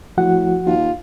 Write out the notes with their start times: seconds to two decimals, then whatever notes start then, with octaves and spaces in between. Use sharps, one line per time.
0.18 A2 F3 F#4 F#5
0.66 D#2 F4